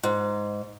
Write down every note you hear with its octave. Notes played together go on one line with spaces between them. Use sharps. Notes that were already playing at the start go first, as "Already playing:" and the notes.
G#2